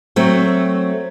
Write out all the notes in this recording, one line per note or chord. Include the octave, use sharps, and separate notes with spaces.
F#3 A3 C4